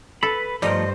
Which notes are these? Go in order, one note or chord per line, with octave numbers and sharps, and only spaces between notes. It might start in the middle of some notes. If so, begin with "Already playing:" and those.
A4 B4 B5
G2 F3 G3 A3 A#4 C5 D#5